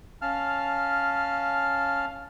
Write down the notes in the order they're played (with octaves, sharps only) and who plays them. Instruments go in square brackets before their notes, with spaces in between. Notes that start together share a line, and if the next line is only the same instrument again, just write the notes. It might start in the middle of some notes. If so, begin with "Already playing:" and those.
[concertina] C#4 F5 A5 F6